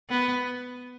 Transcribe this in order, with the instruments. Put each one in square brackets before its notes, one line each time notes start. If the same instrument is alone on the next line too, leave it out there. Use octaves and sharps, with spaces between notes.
[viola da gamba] B3